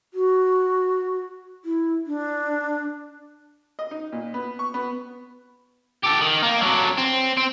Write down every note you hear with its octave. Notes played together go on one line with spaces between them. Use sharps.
F#4
E4
D4
D#5
D#4
A#2
B3
C#6
B3
G4 A4
D#3
A#3
F#3 D4
C4
C4